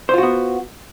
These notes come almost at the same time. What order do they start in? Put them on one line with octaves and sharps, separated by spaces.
C5 F4 F#4 B3